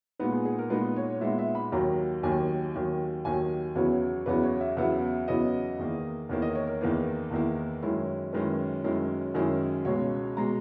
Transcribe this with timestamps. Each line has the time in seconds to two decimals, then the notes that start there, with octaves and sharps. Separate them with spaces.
0.19 A#2 G#3 B3 D#4 B4
0.33 G#4
0.45 G#4
0.59 A#4
0.70 A#2 G#3 B3 D#4 B4
0.96 C#5
1.21 A#2 G#3 B3 D#4 E5
1.39 E5
1.55 B5
1.72 D#2 D#3 F#3 A#5
2.23 D#2 D#3 F#3 G#5
2.74 D#2 D#3 F#3
3.25 D#2 D#3 F#3 G#5
3.75 E2 C#3 F#3 B3 E4 C#5
4.26 E2 C#3 F#3 B3 E4 B4
4.43 C#5
4.61 E5
4.77 E2 C#3 F#3 B3 E4 E5
5.28 E2 C#3 F#3 B3 E4 D#5
5.79 E2 D#3 A#3 E4
6.29 E2 D#3 A#3 E4 C#5
6.42 D#5
6.55 C#5
6.67 A#4
6.81 E2 D#3 A#3 E4 B4
7.31 E2 D#3 A#3 E4
7.83 F#2 D#3 G#3 C#4 E4
8.33 F#2 D#3 G#3 C#4 E4 B4
8.84 F#2 D#3 G#3 C#4 E4
9.34 F#2 D#3 G#3 C#4 E4 G#4
9.85 C#2 B2 G#3 C#5
10.37 B2 G#3 A#5